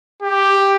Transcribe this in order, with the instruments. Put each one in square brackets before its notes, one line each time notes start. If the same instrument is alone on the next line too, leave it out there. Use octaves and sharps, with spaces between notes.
[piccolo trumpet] G4